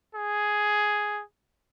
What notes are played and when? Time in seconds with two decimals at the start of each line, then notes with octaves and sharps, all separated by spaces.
0.15 G#4